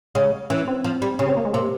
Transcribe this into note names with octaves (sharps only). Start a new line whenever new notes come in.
C#3 G#3
E3 C#4
C4
F3
G3
C#3 C#4
C4
A#3
G#3
C3 A#3